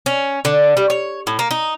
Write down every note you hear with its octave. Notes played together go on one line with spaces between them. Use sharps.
C#4
D3
G3
C#5
A2
A#3
D#4